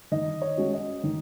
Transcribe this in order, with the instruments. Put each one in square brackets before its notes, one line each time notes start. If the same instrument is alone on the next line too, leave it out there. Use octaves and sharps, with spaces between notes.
[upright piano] D#3 [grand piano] D#5
[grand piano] C#5
[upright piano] G#3 C#4 F#4
[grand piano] D#5
[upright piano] D#3